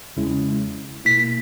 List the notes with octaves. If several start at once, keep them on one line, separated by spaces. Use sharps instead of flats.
E2 C#3 G#3 C#4 E4
B2 A#3 E4 B6